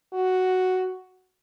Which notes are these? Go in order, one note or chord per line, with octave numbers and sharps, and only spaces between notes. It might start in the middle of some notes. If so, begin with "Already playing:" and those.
F#4